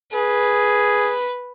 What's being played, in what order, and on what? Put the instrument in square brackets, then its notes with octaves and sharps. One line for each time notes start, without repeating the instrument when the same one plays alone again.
[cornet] G#4 [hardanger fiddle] B4